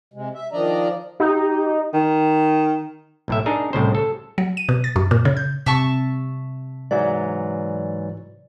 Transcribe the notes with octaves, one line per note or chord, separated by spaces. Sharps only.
C3 G#3
E5
D#3 F3 D4 D5 D#5 A#5
D#4 G4
D#3
B1 A2 E5
D4 D#4 G#4 A#4
C2 A2 C#3 C5
A4
F#3
D#7
B2
A6
F#2
A#2
C#3
G6
C3 E5 A5 C#6
G#2 E3 F#3 D5